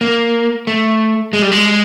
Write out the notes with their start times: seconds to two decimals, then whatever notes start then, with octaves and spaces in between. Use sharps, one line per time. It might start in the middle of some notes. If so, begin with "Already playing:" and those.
0.01 A#3
0.67 A3
1.33 G#3
1.42 G3
1.52 G#3